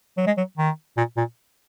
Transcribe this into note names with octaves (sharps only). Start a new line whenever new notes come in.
F#3
G#3
F#3
D#3
A#2
A#2